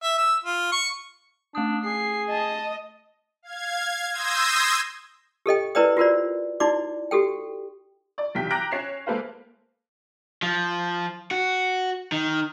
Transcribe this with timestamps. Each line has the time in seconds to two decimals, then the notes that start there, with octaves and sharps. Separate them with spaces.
0.03 E5
0.18 E6
0.44 F4
0.72 C#6
1.55 A3 D4 D#6
1.85 G#4 C7
2.30 D#5 A5
3.43 F5 G#6
4.12 C6 D#6 E6 G6 G#6 A#6
5.46 G4 A4 D#5 G5
5.75 E4 A#4 B4 D5 G5 D#6
5.97 F4 F#4 A#4 C5 D5
6.60 D#4 E4 F#4 D5 D6
7.11 F#4 G4 A4 G5
8.18 D5
8.35 B1 E2 G3 G5 B6
8.50 G5 A#5 D6 F#6 A#6 D7
8.71 C#4 C#5 C7 E7
9.06 G#3 A#3 A4 B4 C5 F5
10.43 F3
11.31 F#4
12.12 D#3